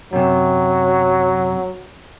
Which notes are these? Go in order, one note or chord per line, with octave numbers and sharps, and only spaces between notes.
F#2 C3 F#3